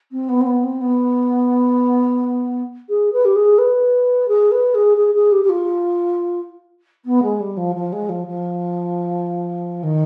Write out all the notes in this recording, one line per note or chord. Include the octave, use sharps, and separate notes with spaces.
C4
B3
C4
B3
C4
B3
G#4
B4
G4
G#4
B4
G#4
B4
G#4
G#4
G#4
G4
G4
F4
B3
G#3
G3
F3
F3
G#3
F3
F3
D#3